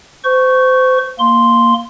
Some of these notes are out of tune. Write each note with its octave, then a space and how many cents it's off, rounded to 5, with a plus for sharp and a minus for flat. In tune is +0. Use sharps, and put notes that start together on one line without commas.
C5 -30 C#6 +0
A#3 +0 C6 +0